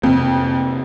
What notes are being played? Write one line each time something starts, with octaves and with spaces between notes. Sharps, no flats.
F2 C3 A#3